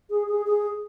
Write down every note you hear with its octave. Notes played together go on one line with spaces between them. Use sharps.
G#4
G#4
G#4